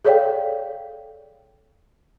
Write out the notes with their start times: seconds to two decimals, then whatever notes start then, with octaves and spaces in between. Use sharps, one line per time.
0.05 G#4 A4 C#5 D5 F5 G5